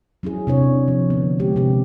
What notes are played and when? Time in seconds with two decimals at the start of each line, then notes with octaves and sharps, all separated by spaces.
0.23 F#3 C#4 E4 G#4
0.47 C3 D4 C#5
0.88 F3
1.10 D3 B3
1.40 G#3 G4
1.56 C3 G#3 C#4 G4